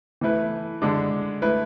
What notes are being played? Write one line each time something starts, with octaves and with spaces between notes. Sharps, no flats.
E3 A3 E4 B4
D3 G#3 D4
A3 E4 B4